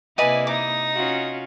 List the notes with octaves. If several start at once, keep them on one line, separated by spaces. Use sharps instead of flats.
C3 A#3 E4 B4 D5 D#5 G#5
D#4 D6 D#6
C#4 F4 F#4